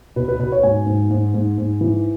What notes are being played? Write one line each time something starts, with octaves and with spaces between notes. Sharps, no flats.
B2 B4
B4
B2 B4
C#5
G#2 G#5
G#2
G#2
G#2
G#2
E3